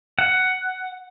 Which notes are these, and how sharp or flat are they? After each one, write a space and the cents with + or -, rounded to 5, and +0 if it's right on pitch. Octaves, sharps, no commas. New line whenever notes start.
F#5 +10